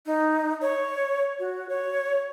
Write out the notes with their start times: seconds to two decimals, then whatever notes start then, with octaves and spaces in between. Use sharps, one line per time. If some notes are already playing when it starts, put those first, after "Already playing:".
0.06 D#4
0.62 C#5
1.39 F#4
1.69 C#5